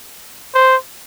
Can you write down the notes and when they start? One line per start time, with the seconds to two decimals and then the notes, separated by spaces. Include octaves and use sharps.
0.54 C5